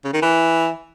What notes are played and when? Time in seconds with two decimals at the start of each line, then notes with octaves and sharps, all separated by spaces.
0.04 C#3
0.13 D#3
0.22 E3